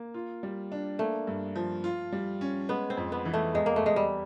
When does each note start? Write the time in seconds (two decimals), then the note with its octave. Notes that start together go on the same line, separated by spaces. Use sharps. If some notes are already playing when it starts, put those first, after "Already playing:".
Already playing: A#3
0.14 F4
0.43 G3
0.72 D4
0.99 A3 A#3
1.27 G2
1.56 F3
1.84 F4
2.12 G3
2.41 C#4
2.69 G#3 B3
2.90 C4
2.97 F2
3.12 B3
3.25 E3
3.34 A3
3.55 E2 G#3
3.66 A#3
3.76 A3
3.82 E2 G#3
3.96 G3